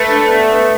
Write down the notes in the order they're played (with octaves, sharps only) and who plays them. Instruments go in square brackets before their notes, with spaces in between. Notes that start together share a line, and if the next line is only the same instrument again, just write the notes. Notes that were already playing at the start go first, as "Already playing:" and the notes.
Already playing: [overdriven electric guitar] A3 [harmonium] B4
[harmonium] D4
B3